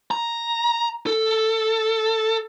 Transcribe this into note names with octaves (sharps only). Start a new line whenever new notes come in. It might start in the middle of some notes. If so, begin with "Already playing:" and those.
A#5
A4